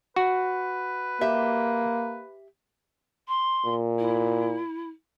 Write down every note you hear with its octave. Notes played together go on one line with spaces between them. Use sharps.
F#4 B4
A#3 G4 E5
C6
A#2
E4